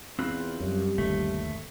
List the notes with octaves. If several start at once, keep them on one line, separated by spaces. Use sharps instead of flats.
E2 C4 F4 B4
F#2 G3
G1 D#2 C3 A3